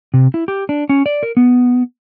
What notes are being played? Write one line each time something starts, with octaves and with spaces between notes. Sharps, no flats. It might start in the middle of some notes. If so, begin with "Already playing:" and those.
C3
E4
G4
D4
C#4
D5
A#4
B3